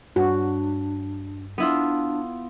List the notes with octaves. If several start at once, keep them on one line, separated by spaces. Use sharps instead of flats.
G2 D4 F#4
B3 D4 E4 F4